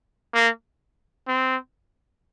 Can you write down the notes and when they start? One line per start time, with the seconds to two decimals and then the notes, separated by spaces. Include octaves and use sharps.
0.34 A#3
1.28 C4